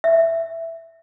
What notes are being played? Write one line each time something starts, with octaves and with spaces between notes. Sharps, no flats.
E5